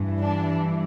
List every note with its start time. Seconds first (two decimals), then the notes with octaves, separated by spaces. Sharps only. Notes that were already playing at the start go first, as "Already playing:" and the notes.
Already playing: G2 E3
0.21 D4